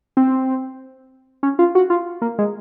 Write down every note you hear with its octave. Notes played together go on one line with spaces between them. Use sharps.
C4
C#4
F4
F#4
F4
A#3
G#3